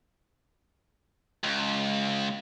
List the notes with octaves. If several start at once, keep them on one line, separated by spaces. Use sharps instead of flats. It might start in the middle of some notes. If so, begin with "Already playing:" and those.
C#2